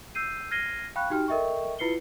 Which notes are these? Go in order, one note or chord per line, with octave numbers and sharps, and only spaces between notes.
E6 G6 C7 D#7
F6 G#6 A#6 C7 D#7 G7
F5 G5 B5 C#6 F#6
D#4 F#4 G4 G5 F6
A4 A#4 D#5 E5 G5 C#6
E4 F4 B4 C7 C#7 G7